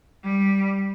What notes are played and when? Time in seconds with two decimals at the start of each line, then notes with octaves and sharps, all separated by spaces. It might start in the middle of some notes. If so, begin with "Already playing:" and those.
0.24 G3